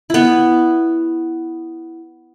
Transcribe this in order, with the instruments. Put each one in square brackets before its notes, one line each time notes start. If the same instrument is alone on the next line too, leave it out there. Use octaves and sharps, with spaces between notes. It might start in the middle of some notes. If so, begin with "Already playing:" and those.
[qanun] B3 E4